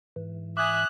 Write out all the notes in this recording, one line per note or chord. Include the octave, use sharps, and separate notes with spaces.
G#2 E3
E5 G#5 D6 D#6 F#6 G#6